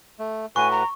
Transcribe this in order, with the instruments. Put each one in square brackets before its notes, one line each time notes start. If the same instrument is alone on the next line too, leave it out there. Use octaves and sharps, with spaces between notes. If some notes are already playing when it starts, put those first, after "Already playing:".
[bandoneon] A3
[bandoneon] A2 F#4 B4 [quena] G#5 [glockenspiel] C#6
[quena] A#5